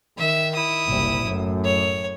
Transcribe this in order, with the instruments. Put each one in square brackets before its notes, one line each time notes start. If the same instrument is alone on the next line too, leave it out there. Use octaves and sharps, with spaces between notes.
[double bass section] D#3 [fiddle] E5
[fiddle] E4 D#6
[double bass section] F#1 C2 A#2
F#2 A2
[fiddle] C#5